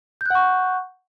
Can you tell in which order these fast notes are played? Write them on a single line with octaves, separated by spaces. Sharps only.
G6 F#6 F#5 C#6